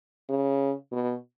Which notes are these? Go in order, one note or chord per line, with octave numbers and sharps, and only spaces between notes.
C#3
B2